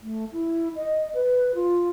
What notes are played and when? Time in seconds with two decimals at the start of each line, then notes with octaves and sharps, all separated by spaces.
0.01 A3
0.33 E4
0.76 D#5
1.14 B4
1.55 F4